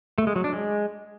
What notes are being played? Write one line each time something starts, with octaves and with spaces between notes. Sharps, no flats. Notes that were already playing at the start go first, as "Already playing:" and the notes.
A3
G#3
F#3
D4
G#3